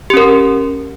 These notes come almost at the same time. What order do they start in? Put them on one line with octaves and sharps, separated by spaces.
G4 C#4 A#4